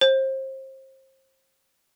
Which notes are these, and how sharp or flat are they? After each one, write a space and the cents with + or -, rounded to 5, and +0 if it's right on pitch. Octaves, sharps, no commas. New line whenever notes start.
C5 +30